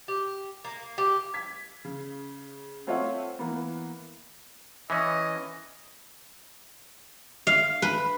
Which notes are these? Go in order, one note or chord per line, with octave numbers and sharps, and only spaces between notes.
G4
A#3
G4
G#6 B6
C#3
A3 C4 F4 C#5 E5 F#5
E3 A#3 B3
E3 C#4 D#5
F5
B4